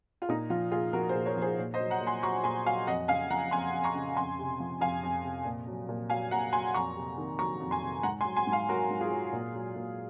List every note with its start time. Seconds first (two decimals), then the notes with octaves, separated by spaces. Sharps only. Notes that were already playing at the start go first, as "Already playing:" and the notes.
0.22 F4
0.29 A#2 D#4
0.50 F3 F4
0.72 A#2 F4 G#4
0.93 F3 F#4 A#4
1.09 G#4 C5
1.15 A#2
1.26 A#4 C#5
1.37 F3 G#4 C5
1.58 A#2
1.74 C5 D#5
1.80 F#3
1.90 F#5 A#5
2.01 A#2
2.07 G#5 C6
2.23 F#3 A#5 C#6
2.44 A#2 G#5 C6
2.66 F#3 F5 G#5
2.87 F2 D#5 F#5
3.08 C#3 F5 G#5
3.30 F3 F#5 A#5
3.51 F2 G#5 C6
3.74 F2
3.84 A#5 C#6
3.95 C#3
4.17 F2 G#5 C6
4.39 C3
4.60 F3
4.80 F2 F5 G#5
5.03 F2
5.24 C3
5.45 A#2
5.67 F#3
5.89 A#2
6.10 F#3 F5 G#5
6.31 A#2 F#5 A#5
6.53 F#3 G#5 C6
6.74 F2 A#5 C#6
6.96 C3
7.18 D#3
7.39 F#3 A#5 C#6
7.60 F2
7.71 G#5 C6
7.82 C3
8.03 G#2 F#5 A#5
8.21 G#5 C6
8.25 F#3
8.36 G#5 C6
8.47 G#2
8.52 F5 G#5
8.69 F#3 F#4 A#4
8.90 G#2
9.00 F4 G#4
9.11 F#3
9.33 A#2
9.55 F#3
9.76 A#2